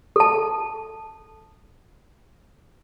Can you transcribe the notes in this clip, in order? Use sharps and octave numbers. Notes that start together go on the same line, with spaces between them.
A4 A5